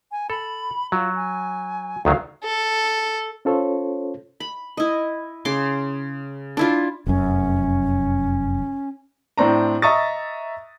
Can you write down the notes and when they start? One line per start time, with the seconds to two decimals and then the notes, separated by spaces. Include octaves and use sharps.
0.11 G#5
0.30 A4 B5
0.92 F#3 F4
1.16 G#5
2.05 D2 D#3 F#3 F5
2.44 A4
3.45 C#4 F4 A4 C5 C#5
4.40 B5
4.77 E4 D#5
5.45 C#3 C6 D6
6.57 D4 E4 F4
7.07 F1 F#2 C#4
9.38 A2 C4 D4 A#5
9.82 D#5 E5 A#5 C#6 D#6 A6